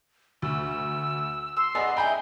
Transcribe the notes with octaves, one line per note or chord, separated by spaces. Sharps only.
D2 E6
C6 E6
B3 D#4 G#4 D5 D#5
D#4 E4 G#4 G5 A#5 B5 G6